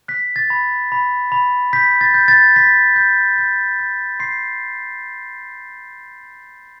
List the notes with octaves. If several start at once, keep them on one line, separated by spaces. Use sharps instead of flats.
F#6 B6
A6
B5
B5
B5
G6 B6
A6
G6
A6
C6 B6
G6
G6
G6
C6 C7